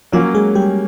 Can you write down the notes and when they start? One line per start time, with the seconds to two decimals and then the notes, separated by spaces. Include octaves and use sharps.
0.12 F3 F#3 A#3 C#4 F4
0.34 G#3 G#4
0.55 G3 G4